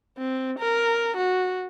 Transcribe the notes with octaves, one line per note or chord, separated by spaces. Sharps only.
C4
A#4
F#4